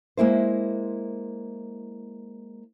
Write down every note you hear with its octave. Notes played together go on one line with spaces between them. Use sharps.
G#3 A#3 E4 C5